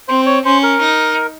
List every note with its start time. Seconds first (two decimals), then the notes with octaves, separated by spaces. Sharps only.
0.08 C4 C5
0.26 C#5
0.45 C#4 C5
0.63 A#4
0.81 D#4